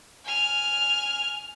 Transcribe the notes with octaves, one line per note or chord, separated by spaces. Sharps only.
G#5 F6